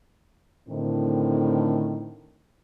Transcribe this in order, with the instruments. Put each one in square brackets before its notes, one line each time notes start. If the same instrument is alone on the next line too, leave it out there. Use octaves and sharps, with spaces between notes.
[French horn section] A2 D3 D#3 C4